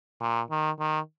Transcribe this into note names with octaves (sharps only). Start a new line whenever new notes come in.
A#2
D#3
D#3